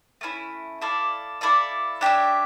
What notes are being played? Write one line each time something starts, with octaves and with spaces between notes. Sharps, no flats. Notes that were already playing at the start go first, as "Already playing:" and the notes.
A3 C#4 E4
E4 A4 D5 F5
E4 A4 D5 F5
D4 G4 C#5 E5